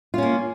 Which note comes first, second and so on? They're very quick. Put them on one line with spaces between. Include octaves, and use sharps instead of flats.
F4 C#4 A#3